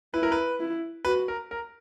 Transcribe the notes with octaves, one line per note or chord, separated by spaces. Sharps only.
E4 B4
A#4
B4
E4
F#4 B4
A#4
A#4